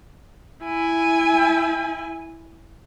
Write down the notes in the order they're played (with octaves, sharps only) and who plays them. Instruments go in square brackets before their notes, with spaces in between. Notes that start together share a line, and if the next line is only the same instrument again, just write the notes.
[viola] E4 G#5